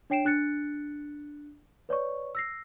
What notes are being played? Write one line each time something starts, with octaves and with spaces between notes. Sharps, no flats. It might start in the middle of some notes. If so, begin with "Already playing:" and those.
D4 C#5 G5 C7 D7 E7
D4 F#6 A6 C#7
B4 C#5 D5 C#6
E6 A#6 C7